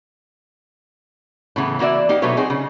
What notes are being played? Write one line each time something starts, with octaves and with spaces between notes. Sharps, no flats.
A2 C#3 E3 B3
E3 A#3 F#4 D5 E5
A#3 D#4 G4
B2 F#3 A3 D4 B4 C#5
C4 D#4 F#4 G#4
C#3